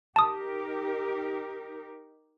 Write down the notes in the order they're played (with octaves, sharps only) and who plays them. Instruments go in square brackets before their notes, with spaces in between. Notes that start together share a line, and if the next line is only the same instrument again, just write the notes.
[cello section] D#4 G4 A#4 [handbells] A5 D#6